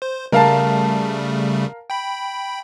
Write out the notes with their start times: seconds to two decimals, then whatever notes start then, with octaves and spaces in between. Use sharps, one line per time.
0.02 C5
0.32 C#3 G3 A3 A#4 F5 A5
1.90 G5 B5